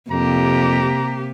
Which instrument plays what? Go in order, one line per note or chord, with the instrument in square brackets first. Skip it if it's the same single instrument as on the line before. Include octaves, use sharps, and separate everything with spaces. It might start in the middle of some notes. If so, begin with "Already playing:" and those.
[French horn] F2 [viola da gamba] C3 [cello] A#3 G4 [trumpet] A#5